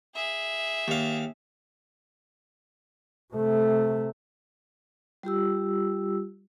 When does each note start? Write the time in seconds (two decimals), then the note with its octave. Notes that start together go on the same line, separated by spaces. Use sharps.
0.15 G#4 E5
0.88 D#2 F5
3.33 C3 A3
5.23 G3 F4 G4 E6